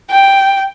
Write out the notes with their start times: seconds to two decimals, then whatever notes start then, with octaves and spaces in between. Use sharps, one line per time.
0.10 G5